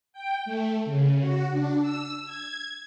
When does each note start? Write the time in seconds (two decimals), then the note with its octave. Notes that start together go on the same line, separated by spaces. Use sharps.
0.13 G5
0.45 A3
0.85 C#3
1.20 F#4
1.51 D4
1.82 E6
2.25 G#6